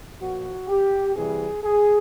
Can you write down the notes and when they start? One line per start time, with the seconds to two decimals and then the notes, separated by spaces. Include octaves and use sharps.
0.21 A#2 F3 F#4
0.68 G4
1.15 C3 E3 G3 G#4
1.63 G#4